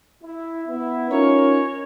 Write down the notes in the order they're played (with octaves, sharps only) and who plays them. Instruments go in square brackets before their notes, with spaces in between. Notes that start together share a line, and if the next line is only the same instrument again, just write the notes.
[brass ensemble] E4
B3 E4
[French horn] C#4 [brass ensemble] D#4 F4 A#4 [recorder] C#5